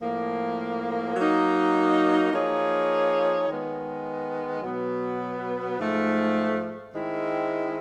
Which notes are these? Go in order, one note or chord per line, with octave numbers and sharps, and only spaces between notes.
A2 F3 A#3
F#3 A#3 D#4
F3 A#3 D#4 G#4 C#5
D#3 G#3 B3
B2 F#3 B3
G#2 F3 A3
D#3 G#3 C4 E4